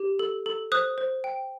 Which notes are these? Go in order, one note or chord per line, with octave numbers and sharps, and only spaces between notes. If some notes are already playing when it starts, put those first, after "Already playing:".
Already playing: G4
A4
A4
C5 D#6 F#6
C5
G5